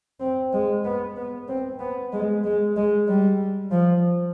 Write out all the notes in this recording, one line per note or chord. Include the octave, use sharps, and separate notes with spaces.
C4
G#3
B3
B3
C4
B3
G#3
G#3
G#3
G3
F3